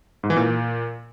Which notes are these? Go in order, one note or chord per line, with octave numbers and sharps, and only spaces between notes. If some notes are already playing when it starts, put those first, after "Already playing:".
G#2
E3
A#2